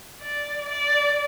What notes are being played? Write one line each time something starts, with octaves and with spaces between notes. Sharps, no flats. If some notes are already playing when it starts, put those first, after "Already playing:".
D5
D5